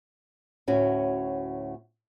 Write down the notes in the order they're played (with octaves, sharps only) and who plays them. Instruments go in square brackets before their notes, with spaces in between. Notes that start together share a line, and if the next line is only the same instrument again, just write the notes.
[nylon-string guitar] D2 A2 C#4 F#4